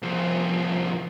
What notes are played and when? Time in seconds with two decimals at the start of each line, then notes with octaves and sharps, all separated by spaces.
0.02 C2 F3